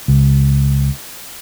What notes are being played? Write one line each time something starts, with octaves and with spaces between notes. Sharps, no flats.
C#2